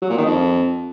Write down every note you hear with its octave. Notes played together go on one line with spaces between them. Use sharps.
F#3
A#2
D#3
F2